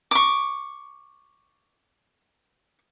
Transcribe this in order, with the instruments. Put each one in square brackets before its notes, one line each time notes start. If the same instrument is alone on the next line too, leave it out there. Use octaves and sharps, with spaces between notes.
[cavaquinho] C#6 D6